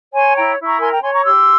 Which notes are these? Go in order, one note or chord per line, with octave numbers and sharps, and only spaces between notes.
C#5 G#5 C6
E4 G5 A#5
E4
A#5 C#6
A#4 G#5 C6
G5 A#5
C#5 G#5 C6
A#5 C#6
G4 C6 E6